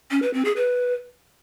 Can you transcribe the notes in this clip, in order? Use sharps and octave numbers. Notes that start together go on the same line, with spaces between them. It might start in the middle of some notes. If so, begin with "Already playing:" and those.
C#4
B4
C4
G#4
B4